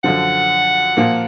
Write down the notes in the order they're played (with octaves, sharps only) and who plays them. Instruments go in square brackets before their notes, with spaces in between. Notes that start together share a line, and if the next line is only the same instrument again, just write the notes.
[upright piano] F#2 D3 F3 [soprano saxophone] F#5
[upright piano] A#2 F3 A#3